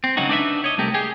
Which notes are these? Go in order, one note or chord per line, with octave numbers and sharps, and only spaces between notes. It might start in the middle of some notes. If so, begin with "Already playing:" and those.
C4
C#3 F#3 G#3 D#4 F#4
D4 D#4 B4 D5 E5
C#5 D#5
C2 A3 G4 A#4
G4 G#4